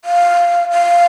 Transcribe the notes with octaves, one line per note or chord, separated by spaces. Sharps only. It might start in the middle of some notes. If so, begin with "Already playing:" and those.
F5
F5